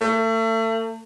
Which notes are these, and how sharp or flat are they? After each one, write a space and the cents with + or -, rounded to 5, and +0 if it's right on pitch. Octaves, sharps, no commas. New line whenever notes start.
A3 +35